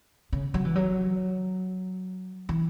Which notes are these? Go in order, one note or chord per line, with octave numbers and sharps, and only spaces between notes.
C#3
F#3
E3
F#3
E3